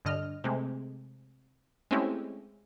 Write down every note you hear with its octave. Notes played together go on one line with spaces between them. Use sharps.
G2 D3 D#5 F6
C3 G#3 A3
G#3 A3 C4 C#4 E4 G4